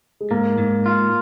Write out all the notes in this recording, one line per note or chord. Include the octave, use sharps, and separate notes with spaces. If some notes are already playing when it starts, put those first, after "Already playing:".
G#3
G#2 A#3
G#2
F4